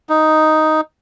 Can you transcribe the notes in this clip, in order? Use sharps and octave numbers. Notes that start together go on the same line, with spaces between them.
D#4